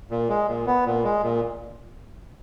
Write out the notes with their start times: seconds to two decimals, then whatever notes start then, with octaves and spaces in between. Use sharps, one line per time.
0.11 A#2
0.29 G#3
0.48 A#2
0.67 B3
0.86 A#2
1.04 G#3
1.23 A#2